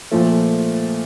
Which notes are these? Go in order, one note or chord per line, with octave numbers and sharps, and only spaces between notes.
A#2 F3 A3